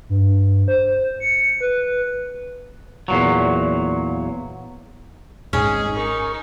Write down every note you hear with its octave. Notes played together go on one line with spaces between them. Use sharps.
G2
C5
C#7
B4
E2 A#2 F#3
D#1 G#1 G#3 C#4 D#4 G#4
D#4 A#4 C#6